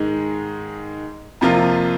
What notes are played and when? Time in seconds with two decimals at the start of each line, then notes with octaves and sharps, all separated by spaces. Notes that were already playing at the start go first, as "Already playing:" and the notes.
Already playing: G#2 D#3 G#3
1.41 F2 C3 F3 A#3 F4